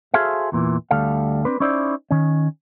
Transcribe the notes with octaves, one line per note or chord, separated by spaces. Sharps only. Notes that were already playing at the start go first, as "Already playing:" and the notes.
F#4 G#4 A4 C5 E5 F5
E2 A#2 E3
D2 G3 A4 F5
C4 D4 B4
C#4 D#4 E4 C5 D5
D#3 C#4